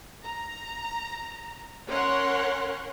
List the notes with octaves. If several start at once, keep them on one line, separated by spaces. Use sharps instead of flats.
A#5
C#4 A#4 C#5 F#5 C6